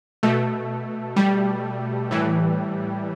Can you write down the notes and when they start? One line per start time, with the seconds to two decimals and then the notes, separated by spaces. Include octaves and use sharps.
0.23 B2 A3
1.16 G3
2.11 A2 E3